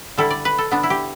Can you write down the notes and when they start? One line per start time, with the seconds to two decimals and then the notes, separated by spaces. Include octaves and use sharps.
0.17 D3 G3 E4 A4
0.30 D5
0.45 B4
0.58 A4
0.71 D3 B3 D4
0.83 E4
0.90 G4